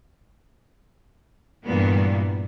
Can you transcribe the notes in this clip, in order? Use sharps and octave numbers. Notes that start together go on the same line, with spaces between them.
G2 A#2 E3 G3 A#3 B3